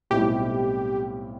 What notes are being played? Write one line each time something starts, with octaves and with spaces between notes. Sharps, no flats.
B1 A2 G3 C4 E4 G4